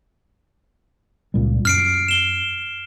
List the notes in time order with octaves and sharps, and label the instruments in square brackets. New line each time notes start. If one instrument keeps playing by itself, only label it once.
[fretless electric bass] C#2 A#2 G3
[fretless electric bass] F#2 [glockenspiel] F6 C7 D7
[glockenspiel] E7 G7